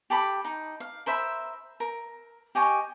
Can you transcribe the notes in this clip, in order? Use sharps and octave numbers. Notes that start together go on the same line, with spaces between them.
G4 A4 B5 D6
D#4
F5
A#4 C5 E5 B5
A#4
G4 D#5 G#5 C#6